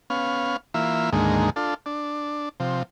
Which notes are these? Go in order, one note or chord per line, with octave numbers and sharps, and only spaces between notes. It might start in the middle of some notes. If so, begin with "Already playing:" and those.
B3 C#4 F5
E3 A#3 F4 E5
D2 G#2 D#3 G#3 A#3
D4 F4 A4
D4
C3 F3